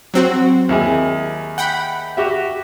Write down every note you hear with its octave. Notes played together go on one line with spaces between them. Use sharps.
F#3 C4 F#4
D#2 E4 G#4
F#5 G5 B5
F#4 G4 E5